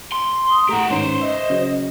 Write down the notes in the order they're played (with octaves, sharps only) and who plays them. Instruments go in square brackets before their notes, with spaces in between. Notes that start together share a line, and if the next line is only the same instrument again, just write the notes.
[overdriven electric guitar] C6
[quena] D#6
[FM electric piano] A2 A3 [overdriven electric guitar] G4 F#5 [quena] A#5
[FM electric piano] G#2 D#3 C#4 [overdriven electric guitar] C5 C#5 [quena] C6
[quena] D#5 [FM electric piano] E5
[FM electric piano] C#3 F#3